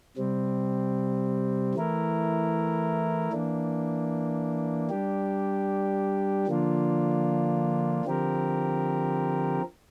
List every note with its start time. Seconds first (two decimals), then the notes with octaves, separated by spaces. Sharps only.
0.17 C3 G3 C4
1.74 E3 A3 E4 A#4
3.32 E3 A#3 D4
4.90 G3 D4 G4
6.47 D3 F3 A#3 D4 F4
8.05 D3 F3 C4 G4 A#4